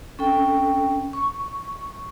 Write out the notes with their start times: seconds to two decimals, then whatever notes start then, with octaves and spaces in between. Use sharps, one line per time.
0.19 C#4 A4 G5
1.13 C#6